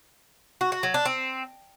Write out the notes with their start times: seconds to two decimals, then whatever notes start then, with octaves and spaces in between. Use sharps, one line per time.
0.61 F#4
0.72 F#4
0.83 F#3
0.94 D4
1.05 C4